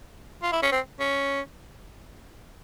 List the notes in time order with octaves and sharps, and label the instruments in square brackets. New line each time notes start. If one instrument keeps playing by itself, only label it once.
[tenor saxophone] F4
E4
C#4
C4
C#4